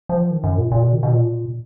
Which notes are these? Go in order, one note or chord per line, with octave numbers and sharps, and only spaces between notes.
F3
D#3
F#2
A#2
A#2
B2
D#3
B2
A#2